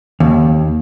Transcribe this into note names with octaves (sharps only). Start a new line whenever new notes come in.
D#2